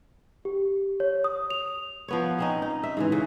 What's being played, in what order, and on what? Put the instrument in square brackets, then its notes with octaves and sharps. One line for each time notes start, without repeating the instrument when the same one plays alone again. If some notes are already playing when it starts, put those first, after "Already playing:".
[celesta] G4
C#5
D#6
F7
[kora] F3 B3 C#5
C4 C#4 D#4
D#4
E5
G#2 C#3 E3
C#3